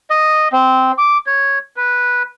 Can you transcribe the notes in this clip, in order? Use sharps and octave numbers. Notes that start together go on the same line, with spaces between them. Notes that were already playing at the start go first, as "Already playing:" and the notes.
D#5
C4
D6
C#5
B4